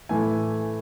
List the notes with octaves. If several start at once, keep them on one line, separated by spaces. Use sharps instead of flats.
A2 E3 A3 G#5